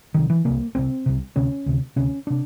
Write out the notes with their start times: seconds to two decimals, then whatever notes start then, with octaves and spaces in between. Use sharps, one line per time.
0.14 C2 C3 D#3
0.30 E3
0.45 C2 C3 A#3
0.75 C2 C3 C4
1.06 C2 C3
1.36 D2 C3 C#4
1.66 D2 C3
1.96 D2 C3 C#4
2.27 C3 D4